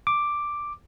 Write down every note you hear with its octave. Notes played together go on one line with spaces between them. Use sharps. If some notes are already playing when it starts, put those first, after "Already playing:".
D6